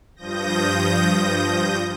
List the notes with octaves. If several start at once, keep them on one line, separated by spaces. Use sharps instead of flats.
G2 F3 D#6 G6 A#6